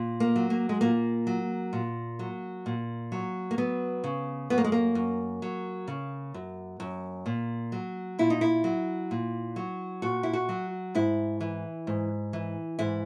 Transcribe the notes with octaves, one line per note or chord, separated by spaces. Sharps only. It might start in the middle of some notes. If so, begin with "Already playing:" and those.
Already playing: A#2
A#3
F#3
A#3
G#3
A#2 A#3
F#3
A#2
F#3
A#2
F#3
A#3
F#3 B3
C#3
F#2 B3
A#3
G#3
A#3
F#2
F#3
C#3
F#2
F#2
A#2
F#3
A#2 E4
D#4
E4
F#3
A#2
F#3
A#2 F#4
E4
F#4
F#3
G#2 E4
E3
G#2
E3
G#2 E4